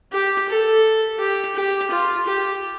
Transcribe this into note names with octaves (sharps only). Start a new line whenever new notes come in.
G4
A4
G4
G4
F4
G4